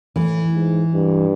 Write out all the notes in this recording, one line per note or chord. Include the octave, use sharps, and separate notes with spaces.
A2 E3
G#2
G2